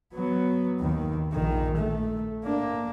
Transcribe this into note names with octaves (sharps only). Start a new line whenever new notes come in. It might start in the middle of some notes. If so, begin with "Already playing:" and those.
F#3 B3
D#2 D#3
A#1 D#3
A3
A#3 D4